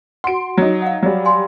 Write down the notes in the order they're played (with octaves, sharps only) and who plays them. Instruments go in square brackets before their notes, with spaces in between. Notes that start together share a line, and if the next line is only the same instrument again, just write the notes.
[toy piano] F#4 F#5 [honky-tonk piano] C6 D7
[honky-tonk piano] F#3 D#4
[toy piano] F5 F#5
[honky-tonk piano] F#3 G3
[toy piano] F5 G#5 C6